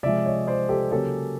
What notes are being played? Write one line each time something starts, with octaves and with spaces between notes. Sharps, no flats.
C3 F3 G#3 D5 E5
C#5 D#5
C5 D5
G4 A4
C#3 F#3 A#3 C#4 G4 A4